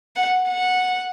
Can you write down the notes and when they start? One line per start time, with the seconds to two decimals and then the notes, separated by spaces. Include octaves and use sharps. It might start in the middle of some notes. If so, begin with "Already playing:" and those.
0.16 F#5
0.49 F#5